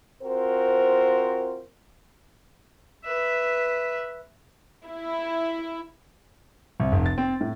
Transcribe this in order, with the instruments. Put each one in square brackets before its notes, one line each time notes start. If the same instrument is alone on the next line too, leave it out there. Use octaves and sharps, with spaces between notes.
[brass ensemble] C4 F4 F#4 A#4 C5
[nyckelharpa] B4 E5
[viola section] E4
[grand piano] C2
F1
A6
C4
A2